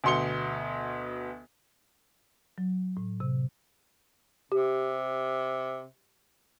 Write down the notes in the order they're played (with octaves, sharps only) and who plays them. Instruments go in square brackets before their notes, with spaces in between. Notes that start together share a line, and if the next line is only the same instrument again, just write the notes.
[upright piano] D2 B2 C6 C#7 G7
[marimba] F#3
A2
C3
[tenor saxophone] C3 [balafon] G4